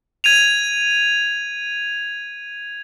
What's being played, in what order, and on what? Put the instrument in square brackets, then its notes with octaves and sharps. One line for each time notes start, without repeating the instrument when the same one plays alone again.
[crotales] G#6 D#7 F7